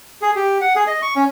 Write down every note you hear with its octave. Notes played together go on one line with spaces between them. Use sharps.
G#4
G4
F#5
G#4
D#5
C#6
C#4